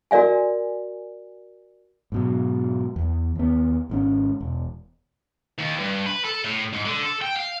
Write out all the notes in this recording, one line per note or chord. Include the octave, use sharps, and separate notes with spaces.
F#4 A#4 D5 E5 G#5
G#2 B2 F#3
E2
D#2 B3
G#1 G#2 C#4
E1
D#2
G2
B4
A4
A2
G#2
D3
A4
G5
F5